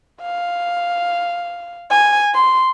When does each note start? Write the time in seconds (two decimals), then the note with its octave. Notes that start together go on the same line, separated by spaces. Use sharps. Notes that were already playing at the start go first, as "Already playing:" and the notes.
0.22 F5
1.91 G#5
2.34 C6